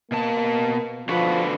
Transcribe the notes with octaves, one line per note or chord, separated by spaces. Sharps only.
B2 A#3 A5
D3 F3 F#4 B4